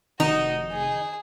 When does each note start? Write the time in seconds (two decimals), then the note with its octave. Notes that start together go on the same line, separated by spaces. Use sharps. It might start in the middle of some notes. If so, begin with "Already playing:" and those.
0.20 F1 D#3 D#4 F#4
0.72 G#4